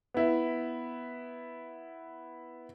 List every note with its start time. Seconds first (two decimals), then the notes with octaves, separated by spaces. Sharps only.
0.14 B3 E4